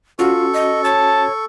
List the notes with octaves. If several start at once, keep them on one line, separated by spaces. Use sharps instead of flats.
C#4 F4 F#4 A4 C#6
D#5
C#5 A5